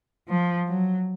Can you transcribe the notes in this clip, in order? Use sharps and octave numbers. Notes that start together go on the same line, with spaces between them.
F3
F#3